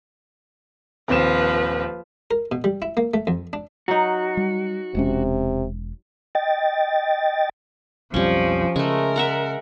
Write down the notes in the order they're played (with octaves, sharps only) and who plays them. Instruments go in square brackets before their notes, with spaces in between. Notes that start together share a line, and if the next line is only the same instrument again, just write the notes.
[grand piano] D#1 C4 E7 [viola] F3 B4
[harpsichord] A#4
B2
G3
E4
A#3
A3
F2
D4
[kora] F#3 D#4 [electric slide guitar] F#4
[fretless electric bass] G3
[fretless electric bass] E1 G#3 C#4 [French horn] C3
[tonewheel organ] D#5 G5 A6
[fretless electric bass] B1 F2 G3 [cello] F3 [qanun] C#4 G4
[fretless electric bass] C#3 [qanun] G#3 A3 [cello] A#4
[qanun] E5 F#5 A#5